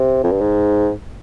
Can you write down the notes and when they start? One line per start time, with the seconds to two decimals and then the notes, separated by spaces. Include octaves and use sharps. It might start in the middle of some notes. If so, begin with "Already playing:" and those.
Already playing: C3
0.24 F2
0.32 G2
0.41 G#2